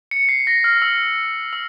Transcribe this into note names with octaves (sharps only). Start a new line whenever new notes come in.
C#7
C7
A#6
F6
E6
E6